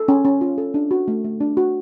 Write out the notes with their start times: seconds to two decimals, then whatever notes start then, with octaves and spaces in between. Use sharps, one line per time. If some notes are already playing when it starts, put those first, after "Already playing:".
Already playing: A4
0.08 C#4
0.25 C#4
0.41 F4
0.58 A4
0.74 D4
0.91 F#4
1.08 A3
1.24 A3
1.40 D4
1.57 F#4